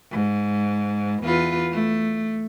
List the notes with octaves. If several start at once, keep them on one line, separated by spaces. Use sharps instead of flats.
G#2
E2 F4 B4
A3